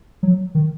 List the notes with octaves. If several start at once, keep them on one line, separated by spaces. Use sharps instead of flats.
F#3
D#3